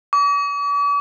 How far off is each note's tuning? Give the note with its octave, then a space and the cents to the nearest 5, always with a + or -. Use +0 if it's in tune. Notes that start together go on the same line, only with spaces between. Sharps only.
D6 -45